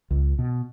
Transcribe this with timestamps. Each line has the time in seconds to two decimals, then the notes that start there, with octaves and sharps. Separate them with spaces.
0.11 C#2
0.39 B2